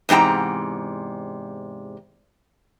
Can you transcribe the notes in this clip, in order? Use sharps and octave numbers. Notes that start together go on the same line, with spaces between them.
E2 G#2 C3 G5 A#5